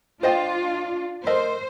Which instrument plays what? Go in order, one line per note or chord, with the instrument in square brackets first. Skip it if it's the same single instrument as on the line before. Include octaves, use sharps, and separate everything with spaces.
[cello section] D4 F4 [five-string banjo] C5 D#5 G5
[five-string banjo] A3 A#4 D#5 [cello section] C5